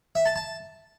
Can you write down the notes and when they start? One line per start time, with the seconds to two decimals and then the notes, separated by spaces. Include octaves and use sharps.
0.15 E5
0.26 A5
0.36 A5